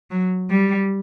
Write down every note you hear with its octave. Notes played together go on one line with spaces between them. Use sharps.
F#3
G3